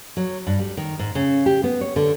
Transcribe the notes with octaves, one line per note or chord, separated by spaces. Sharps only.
F#3
G2
G3
D#3
G#2
C#3
G4
B3
C#5
D3